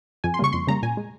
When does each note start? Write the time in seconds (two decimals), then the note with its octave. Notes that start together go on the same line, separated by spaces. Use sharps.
0.24 F2 G#5
0.34 C6
0.39 C#3 G3 A#3 C#6
0.53 F2 C6
0.67 C#3 G3 A#3 A#5
0.83 A#2 G#5
0.97 G#3